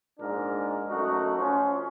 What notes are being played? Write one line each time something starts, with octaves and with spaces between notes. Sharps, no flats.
A#1 G#2 D4 A#4
F#2 A3 D#4 F#4
F3 C#4 C5